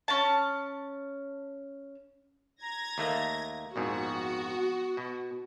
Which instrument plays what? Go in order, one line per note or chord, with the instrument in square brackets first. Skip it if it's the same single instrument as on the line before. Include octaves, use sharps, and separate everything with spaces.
[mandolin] C#4 A5
[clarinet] A#5 [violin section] G#6 A#6
[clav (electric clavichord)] D#2 A3 A#3
[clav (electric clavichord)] A#1 F2 G#2 [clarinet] B3 [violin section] F#4
[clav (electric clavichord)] B2